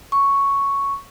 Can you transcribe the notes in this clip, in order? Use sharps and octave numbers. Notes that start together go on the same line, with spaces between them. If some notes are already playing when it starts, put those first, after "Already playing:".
C#6